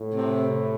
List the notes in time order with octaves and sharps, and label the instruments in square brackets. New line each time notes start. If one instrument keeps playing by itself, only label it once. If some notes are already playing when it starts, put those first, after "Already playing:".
Already playing: [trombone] A2
[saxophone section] C3